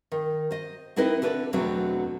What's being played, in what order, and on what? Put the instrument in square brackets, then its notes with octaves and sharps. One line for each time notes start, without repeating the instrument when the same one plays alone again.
[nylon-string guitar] D#3
C5 D#5
C4 D#4 E4 A#4 B4 D#5
D3 A4 B4 C#5 D5
E2 B2 D3 F#3 A3 C4